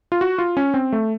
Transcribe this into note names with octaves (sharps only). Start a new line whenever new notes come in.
F4
F#4
F4
C#4
C4
A3